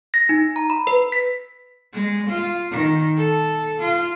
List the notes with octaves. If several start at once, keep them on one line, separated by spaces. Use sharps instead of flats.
A#6
D#4
A#5
B5
B4
B6
G#3
F4
D#3
A4
F4